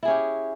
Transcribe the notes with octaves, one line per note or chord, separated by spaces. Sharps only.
C#4 E4 G4 G#4